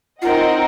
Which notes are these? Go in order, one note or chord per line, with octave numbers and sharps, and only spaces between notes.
C4 D#4 F4 A#4 D#5 F#5